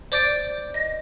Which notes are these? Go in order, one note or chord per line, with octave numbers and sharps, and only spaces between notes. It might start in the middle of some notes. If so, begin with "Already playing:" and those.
C5 D5 D6 G6 A6 D7
D#5 A#6